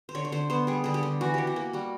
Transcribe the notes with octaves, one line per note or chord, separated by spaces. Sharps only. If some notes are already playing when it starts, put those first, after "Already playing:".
C5
D3 C#5
C#5
D3 C5
B3 C5
G3 G#4
D3 G#4
G4
D3
E3 F#4
E3 G4
F#4
A#3
G3 F#4